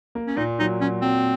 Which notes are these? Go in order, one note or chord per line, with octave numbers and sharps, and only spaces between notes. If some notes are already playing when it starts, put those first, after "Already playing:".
A#3
C#4
A#2 D#4
F#3 D#4
F#3 C#4
F#3 C4